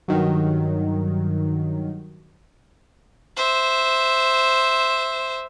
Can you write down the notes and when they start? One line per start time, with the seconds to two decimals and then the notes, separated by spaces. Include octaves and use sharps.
0.08 G2 D#3 F#3
3.36 C5 E5